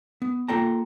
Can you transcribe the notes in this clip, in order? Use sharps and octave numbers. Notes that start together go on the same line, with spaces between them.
B3
A#3 F4 A4 G5 A5 A#5